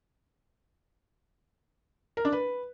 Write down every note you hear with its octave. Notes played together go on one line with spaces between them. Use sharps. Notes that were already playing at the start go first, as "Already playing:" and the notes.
A#4
D4
B4